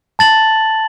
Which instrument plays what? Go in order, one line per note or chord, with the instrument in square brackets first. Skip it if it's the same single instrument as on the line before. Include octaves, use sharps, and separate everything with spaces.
[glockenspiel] A5 A6 F#7